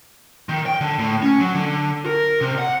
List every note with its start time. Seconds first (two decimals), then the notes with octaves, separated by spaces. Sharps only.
0.49 D#3
0.66 G5
0.81 D3
0.99 A2
1.23 C#4
1.40 F#3
1.55 D3
2.06 A#4
2.41 C3
2.59 F#5